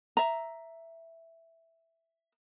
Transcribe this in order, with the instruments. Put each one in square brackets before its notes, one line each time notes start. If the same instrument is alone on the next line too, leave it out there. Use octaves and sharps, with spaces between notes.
[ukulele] E5 A#5